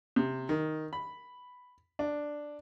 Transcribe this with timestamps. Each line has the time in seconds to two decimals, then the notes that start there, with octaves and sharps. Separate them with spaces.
0.16 C3
0.49 D#3
0.93 B5
1.99 D4